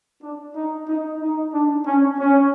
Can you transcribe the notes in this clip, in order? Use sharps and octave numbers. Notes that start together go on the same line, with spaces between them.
D4
D#4
D#4
D#4
D4
C#4
C#4